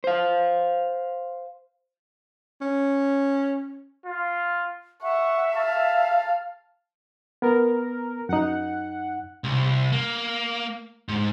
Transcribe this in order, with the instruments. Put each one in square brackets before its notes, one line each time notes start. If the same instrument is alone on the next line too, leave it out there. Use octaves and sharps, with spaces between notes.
[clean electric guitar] C5 F5
[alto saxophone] C#4
[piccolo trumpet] F4
[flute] E5 [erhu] F#5 [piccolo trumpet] C#6
[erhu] F5 [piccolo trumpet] A5
[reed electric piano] B3 [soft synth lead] A#4
[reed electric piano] F#2 D#4 [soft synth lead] F#5
[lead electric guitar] C2
A#3
G#2